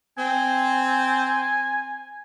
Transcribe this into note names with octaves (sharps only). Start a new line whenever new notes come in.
C4 G#5